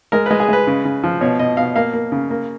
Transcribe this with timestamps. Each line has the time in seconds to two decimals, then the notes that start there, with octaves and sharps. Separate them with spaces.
0.12 G#3 A#4
0.26 G#3 B4
0.40 G#4
0.48 G#3 B4
0.67 C#3
0.85 C#3
1.03 F3
1.21 B2 C#5
1.39 B2 D#5
1.57 B2 F5
1.76 A#3 F5
1.93 A#3
2.12 C#3
2.30 A#3